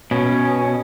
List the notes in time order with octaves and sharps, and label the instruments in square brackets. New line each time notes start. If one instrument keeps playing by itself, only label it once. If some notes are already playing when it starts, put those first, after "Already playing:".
[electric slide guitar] B2 [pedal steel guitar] C#4